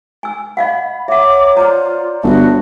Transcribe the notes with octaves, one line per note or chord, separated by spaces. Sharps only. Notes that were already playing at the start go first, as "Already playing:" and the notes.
G#5 E6
D#5 F5 F#5 B5
C#5 E5 F#5 A#5 D6
F4 C5 D5 F#5 A#5
G1 A3 B3 F#4